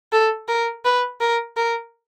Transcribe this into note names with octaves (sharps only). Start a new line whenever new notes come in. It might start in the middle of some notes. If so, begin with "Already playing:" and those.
A4
A#4
B4
A#4
A#4